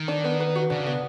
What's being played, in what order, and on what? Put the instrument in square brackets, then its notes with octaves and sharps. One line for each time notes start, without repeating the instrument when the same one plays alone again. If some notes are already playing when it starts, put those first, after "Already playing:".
Already playing: [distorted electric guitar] D#3
[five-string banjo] D4
B3
B4
F#4
[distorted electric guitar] C#3 [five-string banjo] D4
[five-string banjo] B3